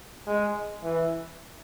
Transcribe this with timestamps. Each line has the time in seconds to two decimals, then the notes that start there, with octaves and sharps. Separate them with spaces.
0.27 G#3
0.84 E3